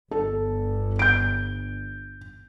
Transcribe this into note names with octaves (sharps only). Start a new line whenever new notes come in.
G1 A4
G6 D7